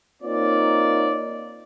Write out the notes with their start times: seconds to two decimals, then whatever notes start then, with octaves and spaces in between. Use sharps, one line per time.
0.23 A#3 C4 D#4 F4 C#5 D5